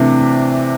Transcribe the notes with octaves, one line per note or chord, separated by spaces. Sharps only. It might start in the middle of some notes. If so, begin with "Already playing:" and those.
Already playing: C3 E3 A3 D4